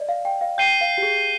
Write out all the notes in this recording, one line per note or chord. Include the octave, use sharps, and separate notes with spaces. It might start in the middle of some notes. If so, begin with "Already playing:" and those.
Already playing: D5 D#5
F5
G5
F5
G5 G6 C7 D#7 G7
F5
G4
G#4